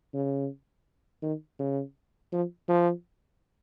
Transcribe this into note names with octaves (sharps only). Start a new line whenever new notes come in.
C#3
D#3
C#3
F3
F3